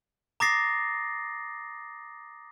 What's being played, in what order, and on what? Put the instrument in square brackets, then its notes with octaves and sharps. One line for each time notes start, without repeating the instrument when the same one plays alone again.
[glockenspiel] A#5 D6 D#6 A6 A#6 C7